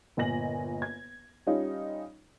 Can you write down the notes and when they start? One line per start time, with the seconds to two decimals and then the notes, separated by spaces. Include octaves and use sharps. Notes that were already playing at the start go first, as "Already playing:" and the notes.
0.17 G1 A#2 D#5 G#5 A#6 F#7
0.82 G#6
1.47 G3 C#4 D#4 F4